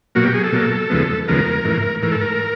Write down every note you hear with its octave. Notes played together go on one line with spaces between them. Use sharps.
B2 F#3 A#3 F#4
G4
G#4
A4
B2 F#3 A#3
D#2 C#3 F3 G#3 B3
D#2 C#3 F3 G#3 B3 A#4
G#2 E3 A3
G#2 E3 A3 A#4
A4
A#4